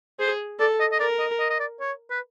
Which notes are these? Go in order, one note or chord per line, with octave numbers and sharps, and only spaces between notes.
G#4 C5
A4 D5
D#5
D#5
A#4 D5
D#5
D#5
D#5
D5
C#5
B4